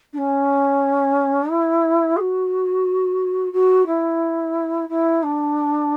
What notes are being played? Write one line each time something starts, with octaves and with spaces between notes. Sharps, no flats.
D4
C#4
E4
G#4
F#4
F#4
E4
E4
D4